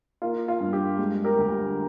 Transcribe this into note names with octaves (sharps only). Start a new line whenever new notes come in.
A#3 F4
F4
G2
G4
G#3
G4 A#4
D2